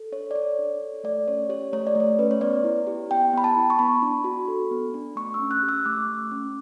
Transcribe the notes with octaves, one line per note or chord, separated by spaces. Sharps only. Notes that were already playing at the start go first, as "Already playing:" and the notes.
Already playing: A4
D4 C#5
D5
A4 C#5
D4
A4
A3 D5
C#4 C#5
G4 C#5
A3 C#5
D5
A3 C#5
C#4 B4
C#5
B3 D5
E4
G4
B3 G5
B3 B5
A5
E4
C#6
B3 B5
D4
F#4
A4
B3
D4
A3 C#6
E6
C#4
F#6
G4
E6
A3 D6
A3
C#4